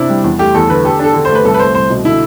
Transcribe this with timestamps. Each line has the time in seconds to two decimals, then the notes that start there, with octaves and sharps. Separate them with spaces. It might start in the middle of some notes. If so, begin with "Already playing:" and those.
Already playing: C3 D4 E4 G4
0.10 G3
0.24 E2
0.39 A3 G4
0.55 E2 A4
0.69 D3 B4
0.85 G4 A4
0.99 D4 A4
1.14 D3
1.25 A3 C5
1.35 B4
1.44 C2 A4
1.54 B4
1.59 A3 C5
1.75 C2 C5
1.90 B2
2.05 D3 E4